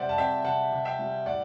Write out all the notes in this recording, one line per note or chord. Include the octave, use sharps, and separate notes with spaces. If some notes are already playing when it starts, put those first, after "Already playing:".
Already playing: C3 G3 C5 D5 E5 F#5
A5
C4 E5 G5
C3 F#5 A5
C3
E5 G5
G3
A2 D5 F#5